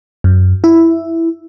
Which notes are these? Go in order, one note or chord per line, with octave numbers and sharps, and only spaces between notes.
F#2
E4